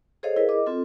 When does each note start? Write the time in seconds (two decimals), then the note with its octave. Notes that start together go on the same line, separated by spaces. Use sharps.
0.23 G#4 A4 C5 C#5 D#5 F5
0.36 E4 G#4 A#4 B4
0.49 D#5 D6
0.67 C4 F4 A4